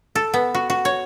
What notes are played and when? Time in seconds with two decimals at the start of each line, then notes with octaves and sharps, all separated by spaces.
0.15 A4
0.34 B3
0.54 F#4
0.70 F#4
0.85 C#5